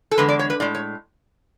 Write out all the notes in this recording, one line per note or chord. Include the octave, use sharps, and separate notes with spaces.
A4
E2 D3 G#3 B4
D5
C#5
B4
A2 G#3 D5
C#5